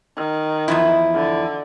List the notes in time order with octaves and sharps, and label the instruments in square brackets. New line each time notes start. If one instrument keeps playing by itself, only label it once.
[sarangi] D#3
[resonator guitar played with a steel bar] E2 F3 E4
[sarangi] D3